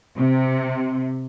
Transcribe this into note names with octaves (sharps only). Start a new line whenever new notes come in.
C3